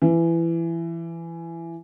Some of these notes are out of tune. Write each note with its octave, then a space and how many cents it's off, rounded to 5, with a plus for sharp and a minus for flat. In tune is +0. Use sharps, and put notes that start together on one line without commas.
E3 +20